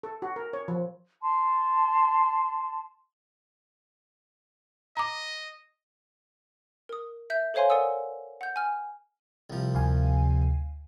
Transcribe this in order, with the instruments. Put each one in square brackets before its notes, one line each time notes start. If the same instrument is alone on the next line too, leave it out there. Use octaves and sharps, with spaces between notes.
[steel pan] A4
F#4
A#4
C#5
F3
[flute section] A5 C6
[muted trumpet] D#5 [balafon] A#5 D6
[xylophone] A#4 D#6
E5 G6
A4 C5 C#5 F5 G#5 C6
A#4 D5 F#5 G#5 D#6 E6
F#5 G6
G#5 F6
[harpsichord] C2 F3
[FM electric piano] D2 F5 G#5